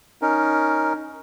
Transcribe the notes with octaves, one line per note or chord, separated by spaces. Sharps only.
C#4 D#4 A#4